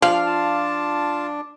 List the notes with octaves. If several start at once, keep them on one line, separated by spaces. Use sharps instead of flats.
F3 D4 F5
F4 A5